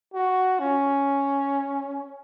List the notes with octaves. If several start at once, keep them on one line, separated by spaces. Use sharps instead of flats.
F#4
C#4